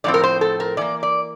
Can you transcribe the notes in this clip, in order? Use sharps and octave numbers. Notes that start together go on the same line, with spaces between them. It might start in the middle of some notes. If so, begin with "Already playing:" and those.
A2 F3 C4 D5
A#4
C5
A4
A#4
E3 A#3 D5
D5